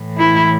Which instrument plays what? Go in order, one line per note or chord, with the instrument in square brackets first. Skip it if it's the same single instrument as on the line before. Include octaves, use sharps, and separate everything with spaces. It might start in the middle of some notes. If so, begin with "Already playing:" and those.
Already playing: [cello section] A2 E3
E4